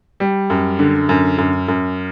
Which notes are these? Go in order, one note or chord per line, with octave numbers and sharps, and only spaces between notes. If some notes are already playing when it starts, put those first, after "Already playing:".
G3
F#2
D3
F#2
F#2
F#2